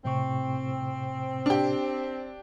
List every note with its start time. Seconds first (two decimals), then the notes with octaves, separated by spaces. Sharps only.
0.05 A2 C3 C4 C#6
1.46 D4 G4